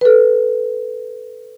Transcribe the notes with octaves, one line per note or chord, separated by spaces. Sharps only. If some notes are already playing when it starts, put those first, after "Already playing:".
A4 B4